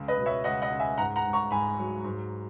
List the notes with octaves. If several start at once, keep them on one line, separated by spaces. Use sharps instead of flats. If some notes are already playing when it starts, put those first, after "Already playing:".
Already playing: C#2
B4 D#5
B2
C#5 E5
C#2 D#5 F#5
D#5 F#5
C#2
E5 G#5
G#2 F#5 A#5
F#5 A#5
G#2
A#5 C#6
G#2 G#5 B5
F#3
G#2